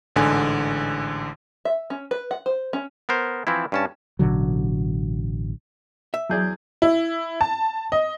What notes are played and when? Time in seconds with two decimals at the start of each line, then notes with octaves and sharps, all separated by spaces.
0.16 A1 G#2 D3 G#5
1.65 E5
1.90 C#4
2.11 B4
2.31 F#5
2.46 C5
2.73 C#4
3.09 B3 A#4 C5
3.47 E3 F3 C4 E4
3.72 G2 C#4 A5
4.19 A1 B2 D3 F#3
6.14 E5
6.30 E2 F#3 G#4 D5 G6 G#6
6.82 E4
7.41 A5
7.92 D#5